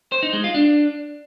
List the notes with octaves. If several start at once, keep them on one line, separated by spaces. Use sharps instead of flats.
C5
D#4
G#3
F4
D4